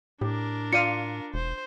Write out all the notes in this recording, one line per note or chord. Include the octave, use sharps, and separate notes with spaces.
A2 D4 G4 A#4
F4 D5 F5 C#7 D#7
E1 C5